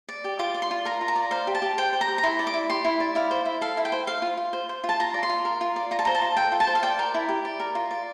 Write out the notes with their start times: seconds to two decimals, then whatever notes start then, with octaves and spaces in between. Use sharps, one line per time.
0.09 D5
0.24 G4
0.39 F4 D6
0.54 D5
0.62 C6
0.71 F4
0.85 A#4 A#5
1.01 F4
1.08 A#5
1.16 D5
1.31 C5 F5
1.47 G4
1.55 A5
1.62 G4
1.78 C5 G5
1.93 C5
2.01 A#5
2.08 G4
2.18 A#5
2.23 E4 C6
2.39 D5
2.47 D6
2.54 E4
2.70 G4 C6
2.85 E4
3.00 D5
3.15 E4 F5
3.31 C5
3.45 E4
3.61 A4 F5
3.77 E4
3.85 G5
3.92 C5
4.07 C5 F5
4.22 F4
4.37 F4
4.53 C5
4.69 C5
4.84 F4
4.89 A5
5.00 F4 A#5
5.14 D5
5.23 C6
5.29 F4
5.45 A#4
5.61 F4
5.76 D5
5.91 F4 A#5
5.99 A5
6.05 C5 A#5
6.15 A5
6.22 F4
6.37 A4 G5
6.52 F4
6.60 A5
6.67 C5
6.75 F5
6.83 D5 G5
6.99 A#4
7.14 E4
7.29 G4
7.45 D5
7.60 A#4
7.75 F4
7.91 D5